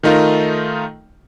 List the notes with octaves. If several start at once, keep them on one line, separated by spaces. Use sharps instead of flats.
D#3 A3 D#4 F4 A#4